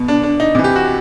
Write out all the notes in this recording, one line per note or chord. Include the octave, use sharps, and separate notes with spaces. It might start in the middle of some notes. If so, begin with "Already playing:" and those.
Already playing: B2
D4
D4
D#4
C3 E3
G4
F#4